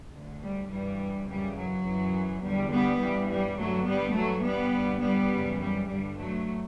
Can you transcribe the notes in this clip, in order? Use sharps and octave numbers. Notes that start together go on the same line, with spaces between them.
D2 D3
G3
G2 E3 G3
F#2 C#3 E3 G3
F#3
F#2 E3
E2 D3 G3
G3 B3
G2 E3 G3
G3
G2 D3 F#3 A3
G3 B3
G2 E3 F#3 A3
G3 B3
G2 D3
G3 B3
F#2 C#3 E3
G3
G2 D3 G3
F#3 A3